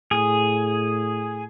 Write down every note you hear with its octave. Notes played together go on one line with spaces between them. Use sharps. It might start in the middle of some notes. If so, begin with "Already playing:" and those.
A2 G#4